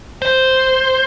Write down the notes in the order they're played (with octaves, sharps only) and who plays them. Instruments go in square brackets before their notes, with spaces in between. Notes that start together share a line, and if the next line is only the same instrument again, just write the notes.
[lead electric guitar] C5